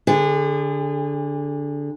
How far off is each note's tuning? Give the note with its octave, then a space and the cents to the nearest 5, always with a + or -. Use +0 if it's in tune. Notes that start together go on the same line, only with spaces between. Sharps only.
D3 -10 G#4 -35